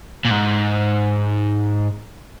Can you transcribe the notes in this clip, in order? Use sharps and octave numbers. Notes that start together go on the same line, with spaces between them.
A#2
G#2